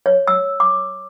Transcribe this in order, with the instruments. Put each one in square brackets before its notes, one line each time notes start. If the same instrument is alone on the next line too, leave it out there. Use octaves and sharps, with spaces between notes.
[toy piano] C#5
E6
D6